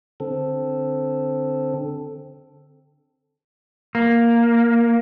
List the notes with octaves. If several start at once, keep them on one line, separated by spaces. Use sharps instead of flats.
D3 C4 A4
A#3